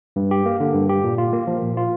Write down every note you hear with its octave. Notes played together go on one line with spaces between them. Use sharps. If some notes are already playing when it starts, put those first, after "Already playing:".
G2
G4
A#3
D3
G2
G4
A#2
F4
A#3
F3
A#2
F4